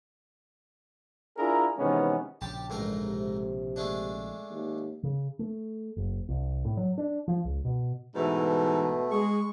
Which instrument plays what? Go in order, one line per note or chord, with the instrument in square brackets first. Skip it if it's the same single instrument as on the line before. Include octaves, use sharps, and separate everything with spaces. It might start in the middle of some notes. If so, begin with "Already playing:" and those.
[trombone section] D4 E4 F4 G#4 A#4
C3 D#3 E3 G#3 B3 C#4
[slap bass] A#1 C#3 [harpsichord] G4 A5
[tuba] A1 [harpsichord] G#2 A3 A#4
[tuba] C3
[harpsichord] G#3 A3 D4
[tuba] D#2
[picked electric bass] C#3
A3
F#1
C2
A2
F#3
D4
F3
C#2
B2
[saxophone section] G#2 E3 [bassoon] B2 [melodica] A3
[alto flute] G#3 [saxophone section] G#4 [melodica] C#6